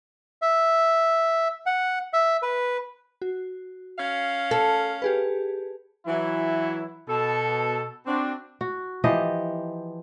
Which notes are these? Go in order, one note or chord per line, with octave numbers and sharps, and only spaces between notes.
E5
F#5
E5
B4
F#4
C#4 F5
A4
G4 G#4 B4
E3 F#3 E4
B2 A4
C4 D4 F#4
F#4
E3 F3 G4 D#5